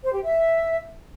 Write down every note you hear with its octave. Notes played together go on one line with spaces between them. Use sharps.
C5
G4
E5